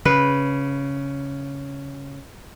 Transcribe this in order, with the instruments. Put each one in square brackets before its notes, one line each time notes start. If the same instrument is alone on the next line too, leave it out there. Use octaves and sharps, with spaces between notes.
[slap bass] C#3 [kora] B4